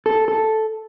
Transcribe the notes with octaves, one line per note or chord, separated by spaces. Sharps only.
A4
A4